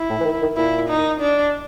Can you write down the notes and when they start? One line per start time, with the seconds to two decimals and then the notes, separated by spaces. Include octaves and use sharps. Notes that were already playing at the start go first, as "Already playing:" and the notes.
Already playing: E4
0.09 A2
0.20 E3
0.25 D#3
0.42 D#3
0.57 A#2 E4
0.89 D#4
1.20 D4